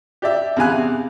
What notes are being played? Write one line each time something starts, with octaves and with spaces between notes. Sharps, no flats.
G4 D5 E5
E2 C3 F5 G#5 F#6